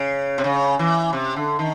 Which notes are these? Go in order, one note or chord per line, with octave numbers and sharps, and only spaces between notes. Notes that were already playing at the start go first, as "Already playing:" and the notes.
Already playing: C#3
C3
C#3
E3
C3
D3
D#3